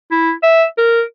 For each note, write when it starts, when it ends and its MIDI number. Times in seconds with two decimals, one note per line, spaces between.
0.11 0.32 64
0.43 0.65 76
0.78 1.03 70